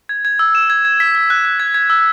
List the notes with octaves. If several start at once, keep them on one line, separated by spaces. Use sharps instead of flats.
G#6
G#6
E6
E7
G#6
G#6
B6
B6
F#6
F#6
G#6
G#6
E6